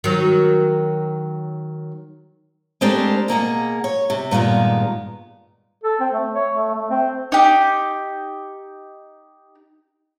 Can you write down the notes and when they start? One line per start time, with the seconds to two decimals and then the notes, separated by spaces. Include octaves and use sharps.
0.04 D#3 F#3
2.81 G#3 A3 C4 D4 G4 A#4
3.28 B2 A#3 G#4 F#5
3.84 C#5
4.10 C3
4.31 G2 A#2 D#3 G#3 B3
5.84 A4
6.00 C4
6.13 A3
6.34 C#5
6.54 A3
6.75 A3
6.90 C4
7.32 D#4 G4